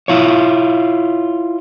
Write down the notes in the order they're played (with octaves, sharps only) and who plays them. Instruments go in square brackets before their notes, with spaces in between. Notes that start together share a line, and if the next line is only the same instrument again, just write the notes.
[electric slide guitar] E4 F4 C#5